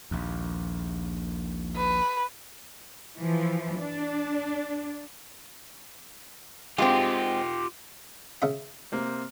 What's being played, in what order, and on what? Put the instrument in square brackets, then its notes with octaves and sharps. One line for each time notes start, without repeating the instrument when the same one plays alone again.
[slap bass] A#1 D#2
[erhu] B4
[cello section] E3 F3
D4
[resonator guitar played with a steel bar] G#3 C4 [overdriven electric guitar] F4 G4
[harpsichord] C#3 E5
[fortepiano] C3 A#3 C4